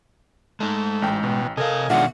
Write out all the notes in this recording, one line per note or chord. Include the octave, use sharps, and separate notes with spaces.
G#3 A3 D#4
A1 G5
B2
C3 A4 A#4 D#5 F5 G#5
B2 D#3 G#3 D4 F4 E5 F#5